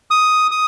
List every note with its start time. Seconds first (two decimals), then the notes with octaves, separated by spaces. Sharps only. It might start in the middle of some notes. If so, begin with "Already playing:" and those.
0.11 D#6
0.51 D#6